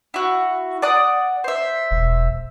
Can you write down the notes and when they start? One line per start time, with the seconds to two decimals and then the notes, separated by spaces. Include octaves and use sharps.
0.14 E4 F#4
0.82 D5 F#5 D#6
1.44 C5 E5
1.91 E1